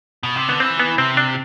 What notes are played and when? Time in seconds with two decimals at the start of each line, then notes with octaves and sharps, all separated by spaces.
0.23 B2
0.36 C3
0.49 D3 B3
0.60 E3 C4
0.80 B3
0.98 C3 C4
1.17 D4